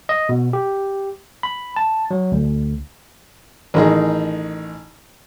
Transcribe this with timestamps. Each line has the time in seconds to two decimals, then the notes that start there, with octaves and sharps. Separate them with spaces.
0.09 D#5
0.29 B2
0.53 G4
1.43 B5
1.76 A5
2.11 F#3
2.32 D2
3.74 A1 D#3 D#4 G#4